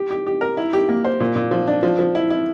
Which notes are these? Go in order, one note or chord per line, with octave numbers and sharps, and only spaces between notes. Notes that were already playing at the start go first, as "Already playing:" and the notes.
Already playing: G4
G4
G4
A#4
E4
G4
A#3
C5
A#2
A#2
F3
D4
F3
F3
E4
E4